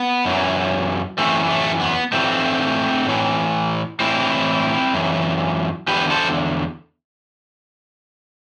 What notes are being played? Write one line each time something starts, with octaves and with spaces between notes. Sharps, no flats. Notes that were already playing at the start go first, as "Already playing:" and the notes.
Already playing: B3
F#2 E3
F#2 E3 A3 C4
A3
B3
A2 E3 A3 C4
A2 E3
A2 E3 C4 E4
F#2 E3
E2 D3 G4 B4
A4 C5